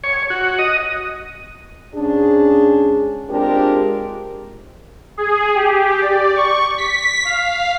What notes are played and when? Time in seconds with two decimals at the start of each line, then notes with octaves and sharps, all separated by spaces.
0.04 C#5
0.30 F#4
0.59 D#5
1.95 G#2 C#4 D4 G#4
3.29 G#3 C4 D4 F4 G4 A#4
5.17 G#4
5.55 G4
6.02 D5
6.36 C#6
6.78 B6
7.25 F5